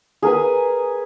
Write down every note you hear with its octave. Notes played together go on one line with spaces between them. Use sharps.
G#4 A#4 B4 G#5